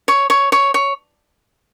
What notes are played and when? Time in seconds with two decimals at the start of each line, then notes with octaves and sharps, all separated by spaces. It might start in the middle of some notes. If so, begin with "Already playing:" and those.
0.08 C#5
0.30 C#5
0.52 C#5
0.74 C#5